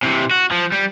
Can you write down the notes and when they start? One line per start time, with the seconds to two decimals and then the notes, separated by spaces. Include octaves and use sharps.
0.03 C3 E3
0.31 F#4
0.51 F3
0.72 G3